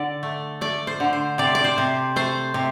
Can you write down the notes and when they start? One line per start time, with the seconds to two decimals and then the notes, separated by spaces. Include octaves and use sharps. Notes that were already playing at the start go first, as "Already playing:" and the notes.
Already playing: D3 D5
0.23 A3
0.61 A3 D5
0.87 C5
1.00 D3
1.13 C5
1.38 C3 D5
1.55 D5
1.64 C5
1.78 C3
2.16 A3 C5
2.54 C3